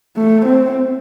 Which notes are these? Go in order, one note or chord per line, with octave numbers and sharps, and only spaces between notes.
A3
C4